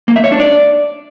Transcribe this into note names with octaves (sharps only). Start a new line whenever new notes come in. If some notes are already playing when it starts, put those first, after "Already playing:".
A#3
E5
C#5
D4
D5